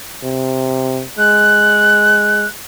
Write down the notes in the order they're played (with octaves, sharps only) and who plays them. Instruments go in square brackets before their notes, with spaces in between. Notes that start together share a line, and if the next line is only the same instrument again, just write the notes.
[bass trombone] C3
[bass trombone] G#3 [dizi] F#6